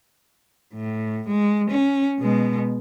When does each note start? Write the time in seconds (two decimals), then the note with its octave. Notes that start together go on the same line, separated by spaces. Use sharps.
0.74 A2
1.28 G#3
1.70 C#4
2.20 B2 G#3